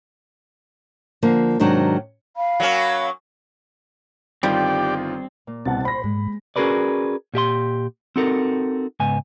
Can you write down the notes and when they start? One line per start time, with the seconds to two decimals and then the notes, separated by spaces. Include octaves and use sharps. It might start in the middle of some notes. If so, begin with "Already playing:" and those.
1.23 D3 F3 A#3
1.60 G#2 C3 D#3 F#3 D4
2.36 F5 B5
2.60 F#3 A#3 C#4
4.43 G1 D#3 G3 C4 F4 G4 D5
5.47 A#2
5.65 C2 B2 C4 F#5 A5
5.85 C5 B5 A#6
6.04 G#2 G#3
6.56 C#4 F#4 G#4 A#4 B4 D5
7.34 A#2 G4 E5 C6
8.16 C4 D#4 F#4 A4 A#4
9.00 C#2 G#2 B3 G#5